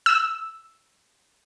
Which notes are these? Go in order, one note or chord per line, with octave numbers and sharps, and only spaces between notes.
E6